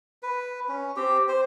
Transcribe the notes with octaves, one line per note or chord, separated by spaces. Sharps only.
B4
C#4
C4 G4
C5